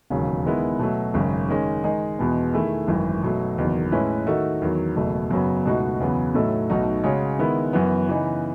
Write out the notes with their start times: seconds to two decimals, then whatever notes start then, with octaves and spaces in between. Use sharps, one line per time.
0.10 E1 D#2 C#3 F#3
0.45 D#3 G#3 B3 E4
0.79 B2 F#3 A3
1.14 G#1 F#2 C#3
1.49 D#3 G#3 C#4
1.84 D#3 G#3 D#4 G#4
2.19 E2 B2 G#3 B3
2.53 D#3 A3 E4 G#4
2.88 G#1 F#2 E3
3.22 B2 F#3 A3
3.58 F#1 E2 D#3 F#3
3.92 A2 G#3 C#4 E4 B4
4.26 D#3 A3 D#4 F#4 A4
4.62 E2 D#3 F#3
4.96 F#1 E2 B2 A3
5.31 F#2 C#3 F#3 B3
5.65 C#2 B2 A3 D#4 F#4
6.00 E2 C#3 F#3 B3
6.35 A2 F#3 A3 D#4 A4
6.69 B1 B2 A3 D#4 F#4
7.04 C#3 G#3 C#4 F#4 C#5
7.39 D#3 G#3 B3 E4
7.73 F#2 E3 B3
8.08 C#3 E3 B3 D#4